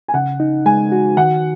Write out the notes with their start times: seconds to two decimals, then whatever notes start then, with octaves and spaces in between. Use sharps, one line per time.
0.08 G#5
0.14 C#3 F#5
0.40 D#4
0.66 G#3 G#5
0.92 F#4
1.17 D#3 F#5